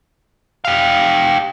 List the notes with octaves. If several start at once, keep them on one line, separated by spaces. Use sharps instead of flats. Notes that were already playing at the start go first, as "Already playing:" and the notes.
G4 F5